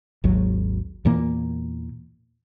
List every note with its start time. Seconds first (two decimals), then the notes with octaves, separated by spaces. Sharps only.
0.24 G#1 D#2 F#3
1.05 E2 A#2 E3 A#3